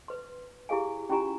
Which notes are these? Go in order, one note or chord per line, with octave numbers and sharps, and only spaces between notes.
B4 C6
E4 G4 G#4 F5 G#5
C#4 E4 F4 G4 G#5 A#5